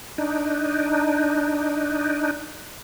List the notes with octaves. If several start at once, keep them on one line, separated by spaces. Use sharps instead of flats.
D4 D#4